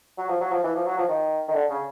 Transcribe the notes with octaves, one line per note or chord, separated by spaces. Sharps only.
F#3
F3
F#3
F3
E3
F3
F#3
F3
D#3
D#3
D3
C#3